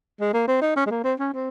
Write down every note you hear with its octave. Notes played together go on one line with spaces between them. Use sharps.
G#3
A#3
C4
D#4
C#4
G#3
A#3
C4
C#4
C4